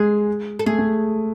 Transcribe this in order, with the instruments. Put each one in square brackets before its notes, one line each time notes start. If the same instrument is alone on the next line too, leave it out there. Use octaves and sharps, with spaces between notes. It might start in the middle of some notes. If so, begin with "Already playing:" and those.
Already playing: [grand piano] G#3 [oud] G#4
[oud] A4
[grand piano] A3 [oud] G#4
[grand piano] A3